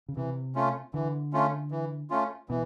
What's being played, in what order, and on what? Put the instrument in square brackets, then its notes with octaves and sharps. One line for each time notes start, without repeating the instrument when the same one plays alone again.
[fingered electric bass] C#3
[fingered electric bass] C3 [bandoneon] E3
[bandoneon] A3 C#4 F4
[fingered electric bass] D3 [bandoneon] E3
[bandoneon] A3 C#4 F4
E3
A3 C#4 F4
[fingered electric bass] B2 [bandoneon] E3